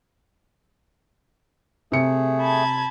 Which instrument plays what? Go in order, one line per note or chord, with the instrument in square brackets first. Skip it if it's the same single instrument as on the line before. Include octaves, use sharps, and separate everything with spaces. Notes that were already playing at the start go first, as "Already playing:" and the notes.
[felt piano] C3 C#7 [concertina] A3 G#4
[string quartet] A5 B5 G#6